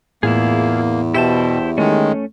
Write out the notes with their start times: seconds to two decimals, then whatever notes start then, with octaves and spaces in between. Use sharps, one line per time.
0.23 E2 A2 A#3 E4 F4 G#4
1.14 B2 E4 G4 C5 E5 G5 A5
1.78 D#3 G#3 A3 C#4